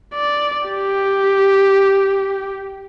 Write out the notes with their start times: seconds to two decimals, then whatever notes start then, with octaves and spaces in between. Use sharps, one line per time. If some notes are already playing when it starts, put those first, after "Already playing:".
0.15 D5
0.68 G4